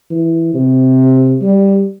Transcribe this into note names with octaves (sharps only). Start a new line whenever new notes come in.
E3
C3
G3